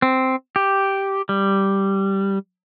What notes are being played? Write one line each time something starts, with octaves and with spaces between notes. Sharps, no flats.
C4
G4
G3